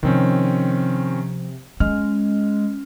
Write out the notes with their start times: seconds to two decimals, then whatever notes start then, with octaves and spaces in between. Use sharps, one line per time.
0.03 C3 D#3 F3 C4 C#4
1.80 G#3 C#4 F6